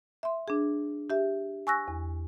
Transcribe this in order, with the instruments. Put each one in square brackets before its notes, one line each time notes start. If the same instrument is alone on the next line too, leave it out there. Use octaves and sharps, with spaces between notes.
[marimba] E5 C6
D4 G#4
G4 E5
G#5 C#6 E6 F#6 A#6
E2